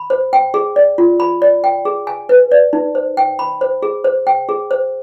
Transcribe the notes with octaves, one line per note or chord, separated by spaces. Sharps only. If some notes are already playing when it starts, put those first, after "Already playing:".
Already playing: B5
C5
G5
G#4
D5
F4
B5
D5
G5
G#4
G#5
B4
D5
D#4
C5
G5
B5
C5
G#4
C5
G5
G#4
C5